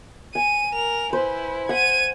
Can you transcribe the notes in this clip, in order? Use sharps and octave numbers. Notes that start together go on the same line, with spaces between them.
G#5 D#7
A#4 F7
E4 B4 C5
F#5 G#6 D#7